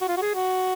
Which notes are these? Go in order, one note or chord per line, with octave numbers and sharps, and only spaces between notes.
F#4
F4
F#4
G#4
F#4